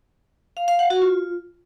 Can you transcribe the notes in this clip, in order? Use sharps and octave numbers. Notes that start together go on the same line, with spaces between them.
F5
F5
F#5
F#4
F4